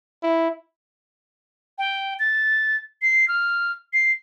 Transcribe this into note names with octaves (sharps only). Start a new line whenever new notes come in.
E4
G5
A6
C7
F6
C7